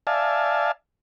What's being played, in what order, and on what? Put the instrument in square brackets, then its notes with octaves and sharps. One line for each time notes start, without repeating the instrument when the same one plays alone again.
[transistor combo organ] D5 E5 F5 G#5 A5